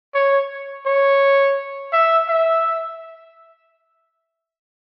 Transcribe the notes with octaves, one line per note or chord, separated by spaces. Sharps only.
C#5
C#5
E5
E5